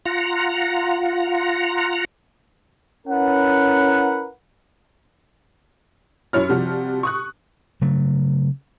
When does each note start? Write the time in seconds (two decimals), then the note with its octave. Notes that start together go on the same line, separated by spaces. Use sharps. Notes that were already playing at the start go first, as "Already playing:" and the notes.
0.06 F4 F#5 A#5
3.07 C#4 E4 A#4 B4 F#5
6.33 F#2 E4 C#5 F6
6.49 C3 F3 G3 F#4
7.03 C#6 D#6 F#6
7.81 C#3 F#3 A3